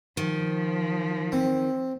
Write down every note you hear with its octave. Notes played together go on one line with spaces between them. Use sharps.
D#3 F3
C4